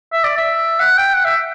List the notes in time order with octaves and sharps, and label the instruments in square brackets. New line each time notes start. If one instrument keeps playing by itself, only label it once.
[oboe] E5
D5
E5
F#5
G5
F#5
E5